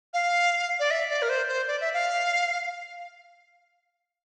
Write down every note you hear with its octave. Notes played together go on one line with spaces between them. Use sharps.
F5
D5
E5
D5
A#4
C5
C5
D5
E5
F5